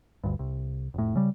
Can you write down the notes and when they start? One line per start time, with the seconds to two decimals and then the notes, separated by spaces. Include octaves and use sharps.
0.24 G1 D2 G2
0.39 C2
0.94 F1 A2
1.15 C#3 G3